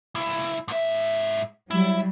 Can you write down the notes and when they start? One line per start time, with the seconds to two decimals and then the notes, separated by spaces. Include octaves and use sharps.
0.15 C#2 E4
0.68 G#2 E5
1.71 F#3 G3 E4